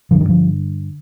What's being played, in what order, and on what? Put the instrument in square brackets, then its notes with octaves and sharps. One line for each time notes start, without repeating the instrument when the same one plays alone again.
[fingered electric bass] G2 D3 F3
D#3
F3